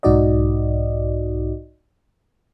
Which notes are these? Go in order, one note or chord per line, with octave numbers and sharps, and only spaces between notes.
B1 G#2 D#4 F#4 D5 D#5